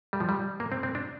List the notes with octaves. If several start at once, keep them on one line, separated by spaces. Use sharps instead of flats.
G3
F3
G3
A#3
C4
C4
D4